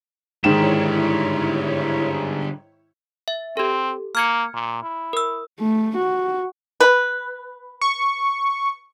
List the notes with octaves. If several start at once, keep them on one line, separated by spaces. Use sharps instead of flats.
G#2 D3 D#3 G3 E4 C#5 E7
E5
C4 G4 A4
A#3 F6 G#6 C#7
A#2
E4
A#4 E6
A3
F#4
B4
C#6